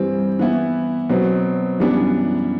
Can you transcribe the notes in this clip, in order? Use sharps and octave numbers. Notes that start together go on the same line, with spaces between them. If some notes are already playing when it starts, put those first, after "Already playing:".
Already playing: G2 E3 G3 C4
E3 B3 E4
B2 F#3 C4
F#2 E3 G3 B3 D4